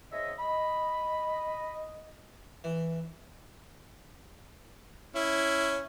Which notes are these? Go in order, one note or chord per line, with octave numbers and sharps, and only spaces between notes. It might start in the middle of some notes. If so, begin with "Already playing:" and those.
G#2 C#5 D#5 E5
D#5 B5
E3
C#4 E4